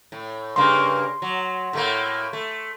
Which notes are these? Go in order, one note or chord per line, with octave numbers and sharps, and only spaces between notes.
A2
G2 C#3 A#3 C6
F#3
A2 A3 A#3
A3